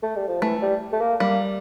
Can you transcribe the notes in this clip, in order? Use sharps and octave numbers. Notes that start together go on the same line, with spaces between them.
A3
G3
F3
E3 A3
G3
A3
A#3
G3 A#3